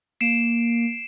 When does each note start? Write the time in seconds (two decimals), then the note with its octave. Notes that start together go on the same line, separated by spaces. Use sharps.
0.21 A#3 C7 D7 E7